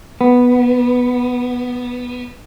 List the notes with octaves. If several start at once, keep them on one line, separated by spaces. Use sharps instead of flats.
B3